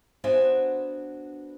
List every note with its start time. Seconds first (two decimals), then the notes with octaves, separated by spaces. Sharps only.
0.24 B3 D4 F#4 C5 E5 G#5